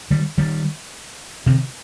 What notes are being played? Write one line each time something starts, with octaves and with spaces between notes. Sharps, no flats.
D#3 G3
D#3 G3
C3 D#3